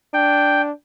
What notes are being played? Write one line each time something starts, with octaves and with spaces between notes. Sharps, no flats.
D4 G5